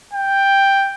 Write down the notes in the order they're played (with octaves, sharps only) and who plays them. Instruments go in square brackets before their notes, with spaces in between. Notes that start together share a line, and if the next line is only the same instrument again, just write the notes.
[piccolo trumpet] G5